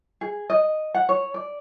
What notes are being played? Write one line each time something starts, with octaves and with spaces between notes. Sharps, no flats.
G#4
D#5
F#5
C#5
D5